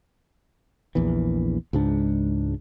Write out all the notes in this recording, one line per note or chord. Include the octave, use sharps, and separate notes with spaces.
A#1 E2 E3
C#2 G#2 D4